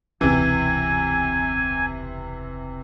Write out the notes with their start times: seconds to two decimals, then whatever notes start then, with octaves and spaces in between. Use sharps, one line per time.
0.21 E1 C#2 C3 E3 G#5